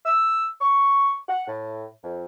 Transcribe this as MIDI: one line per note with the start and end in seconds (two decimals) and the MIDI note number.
0.06 0.48 88
0.61 1.16 85
1.29 1.46 78
1.48 1.86 45
2.04 2.25 41